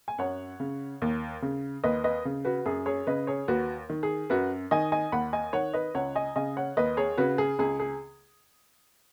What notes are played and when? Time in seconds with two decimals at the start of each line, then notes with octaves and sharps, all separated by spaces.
0.08 G#5
0.18 F#2 C#5 F#5
0.60 C#3
1.02 D#2
1.42 C#3
1.84 D#2 B4 D#5
2.04 B4 D#5
2.25 C#3
2.45 F#4 B4
2.66 F#2 G#4
2.86 G#4 C#5
3.07 C#3 B4 D#5
3.27 G#4 C#5
3.48 D#2 F#4 B4
3.90 D#3
4.03 G#4
4.30 F#2 F#4 B4
4.71 D#3 D#5 G#5
4.92 D#5 G#5
5.12 D#2 F#5 B5
5.33 D#5 G#5
5.53 D#3 C#5 F#5
5.74 B4 D#5
5.95 C#2 C#5 F#5
6.15 D#5 G#5
6.36 C#3 D#5 G#5
6.57 C#5 F#5
6.77 D#2 B4 D#5
6.97 G#4 C#5
7.18 C#3 F#4 B4
7.38 G#4
7.59 C#2 G#4
7.80 G#4